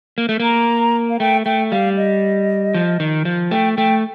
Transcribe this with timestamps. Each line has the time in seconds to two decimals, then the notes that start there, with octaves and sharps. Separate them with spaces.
0.18 A#3
0.29 A3
0.40 A#3 A#5
1.10 F5
1.19 A3 G5
1.46 A3 G5
1.71 G3 F5
1.97 D#5
2.74 F3
3.00 D#3
3.25 F3
3.51 A3 G5
3.77 A3 G5